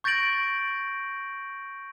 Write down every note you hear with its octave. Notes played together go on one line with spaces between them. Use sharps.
C#6 G6 A6 A#6 D7 F#7